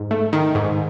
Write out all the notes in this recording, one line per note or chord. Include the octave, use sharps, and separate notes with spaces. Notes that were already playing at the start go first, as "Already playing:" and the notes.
Already playing: G#2
A3
D#3
G#2